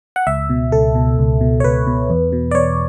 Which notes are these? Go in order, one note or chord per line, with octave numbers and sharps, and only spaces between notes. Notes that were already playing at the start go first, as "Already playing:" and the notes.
F#5
C#2 E5
B2
C#2 A4
B2
C#2
B2
C#5
C#2 B4
B2
E2
B2
D5
E2 C#5